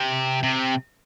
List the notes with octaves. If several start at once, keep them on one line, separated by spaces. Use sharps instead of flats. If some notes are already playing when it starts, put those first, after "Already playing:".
Already playing: C3
C3